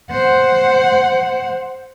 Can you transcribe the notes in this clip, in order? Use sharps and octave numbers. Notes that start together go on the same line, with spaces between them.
C5 F#5